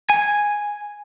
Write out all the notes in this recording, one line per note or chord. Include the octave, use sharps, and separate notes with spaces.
G#5